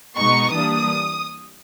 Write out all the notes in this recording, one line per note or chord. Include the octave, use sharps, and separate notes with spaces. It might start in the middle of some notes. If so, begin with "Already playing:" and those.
B2 G#3 B3 D#4 C#6
E3 G3 A#3 D4 D#6